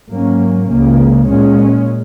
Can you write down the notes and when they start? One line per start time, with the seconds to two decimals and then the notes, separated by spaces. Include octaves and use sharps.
0.10 G#2 F#3 A#3 C#4
0.69 C#2 C#3 A#3
1.27 A#2 G#3 C#4